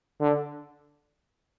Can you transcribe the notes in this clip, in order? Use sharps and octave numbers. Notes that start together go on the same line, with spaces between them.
D3